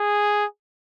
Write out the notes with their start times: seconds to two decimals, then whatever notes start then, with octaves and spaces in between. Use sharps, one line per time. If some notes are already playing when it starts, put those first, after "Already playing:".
Already playing: G#4